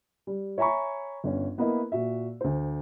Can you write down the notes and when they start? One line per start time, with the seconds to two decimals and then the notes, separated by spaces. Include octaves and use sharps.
0.27 G3
0.58 C#5 E5 G#5 A#5 B5 C#6
1.24 G1 C#4
1.58 A#3 B3 E4 A#4 B4 D#5
1.92 A#2 F#4 E5
2.41 D2 C5